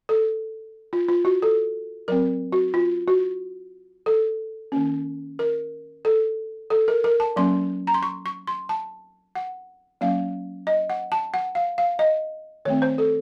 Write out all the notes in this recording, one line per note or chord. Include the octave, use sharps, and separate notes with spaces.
A4
F4
F4
F#4
A4
F#3 C4 A#4
F#4
F4
F#4
A4
D#3 A#3 C#4
A#4
A4
A4
A#4
A#4
A5
F#3 A#3 C#4 C6
A#5
C6
C#6
C#6
C6
A5
F#5
F#3 A#3 C#4 F5
D#5
F#5
A5
F#5
F5
F5
D#5
D#3 A3 C4 C#5
C5
A4